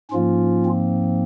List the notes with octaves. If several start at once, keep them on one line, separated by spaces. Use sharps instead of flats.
G#2 F3 A#3 C#4 F4
C4